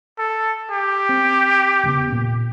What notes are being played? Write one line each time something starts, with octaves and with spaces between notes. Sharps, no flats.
A4
G4
C4
E1 C#3 B3
A#2